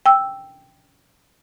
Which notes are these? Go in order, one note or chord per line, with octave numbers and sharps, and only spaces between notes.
G5 E6